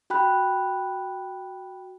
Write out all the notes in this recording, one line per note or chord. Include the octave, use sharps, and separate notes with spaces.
F#4 G5 B5 F#6